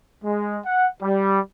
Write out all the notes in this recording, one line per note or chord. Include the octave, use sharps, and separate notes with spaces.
G#3
F#5
G3